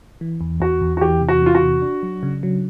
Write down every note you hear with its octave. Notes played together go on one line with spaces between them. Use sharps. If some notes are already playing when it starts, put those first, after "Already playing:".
E3
E2
E2 F#4
E2
F#4
E3 G4
C3
F#4
E3 F4
F#4
C3
D4
F#3
C#3
F#3